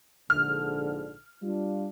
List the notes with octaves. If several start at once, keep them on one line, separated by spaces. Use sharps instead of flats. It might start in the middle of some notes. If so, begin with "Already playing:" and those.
A#1 G#2 D3 F6
G3 D4 F4